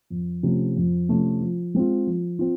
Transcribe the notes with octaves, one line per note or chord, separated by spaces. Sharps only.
F2
C3 F3 A3 C#4
F2
C3 F3 A3 C#4
F3
G#3 C4 F4
F3
C4 F4